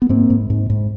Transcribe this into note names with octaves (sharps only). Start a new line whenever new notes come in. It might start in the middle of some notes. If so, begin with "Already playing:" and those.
B3
G#2 A#3 C4
G#2
G#2
G#2